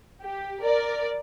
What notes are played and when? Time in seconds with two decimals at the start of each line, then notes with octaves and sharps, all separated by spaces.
0.23 G4
0.62 A#4 D5